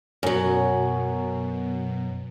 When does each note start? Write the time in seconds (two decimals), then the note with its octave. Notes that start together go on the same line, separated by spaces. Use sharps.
0.23 F#2 B2 F#3